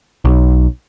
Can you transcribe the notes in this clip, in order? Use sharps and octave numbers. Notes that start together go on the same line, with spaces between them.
B1